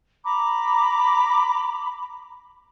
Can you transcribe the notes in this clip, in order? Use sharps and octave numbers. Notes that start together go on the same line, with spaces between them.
A#5 B5 D6